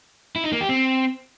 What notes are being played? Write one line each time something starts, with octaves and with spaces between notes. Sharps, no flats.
E4
D#4
A#3
G4
C4